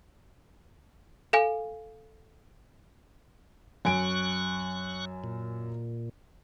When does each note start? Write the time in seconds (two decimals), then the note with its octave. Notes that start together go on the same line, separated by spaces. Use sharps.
1.33 A4 F5 G#5
3.85 F#2 G#5 C#6 F#6 D7
5.24 A#2